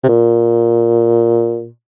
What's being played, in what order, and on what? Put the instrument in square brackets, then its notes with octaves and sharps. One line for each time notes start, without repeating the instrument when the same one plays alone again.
[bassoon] C3
A#2